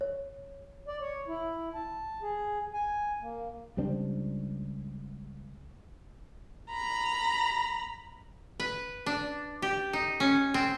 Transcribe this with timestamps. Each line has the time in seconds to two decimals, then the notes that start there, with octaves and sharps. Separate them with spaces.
0.01 C#5
0.86 D5
1.01 C#5
1.28 E4
1.74 A5
2.22 G#4
2.74 G#5
3.22 A#3
3.77 C#2 G3 C4 D4
6.71 A#5 B5
8.60 B4
9.06 D4
9.62 G4
9.93 D#4
10.20 C#4
10.54 C4